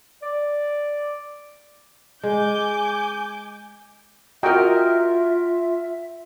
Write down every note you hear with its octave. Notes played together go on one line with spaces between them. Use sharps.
D5
G#3 G#5 D6 G6
F4 F#4 A#4 D#5 E5 G5 A#5